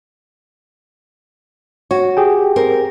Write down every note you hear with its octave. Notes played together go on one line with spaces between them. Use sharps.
F#4 C#5
G4 G#4 G5
C4 A#4